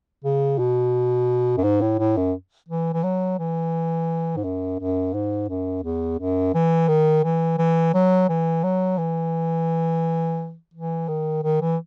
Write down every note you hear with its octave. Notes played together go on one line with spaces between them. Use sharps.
C#3
B2
F#2
G#2
A2
A2
F#2
E3
E3
F#3
E3
G#2
F#2
F#2
G#2
F#2
E2
F#2
E3
D#3
E3
E3
F#3
E3
F#3
E3
E3
D#3
D#3
E3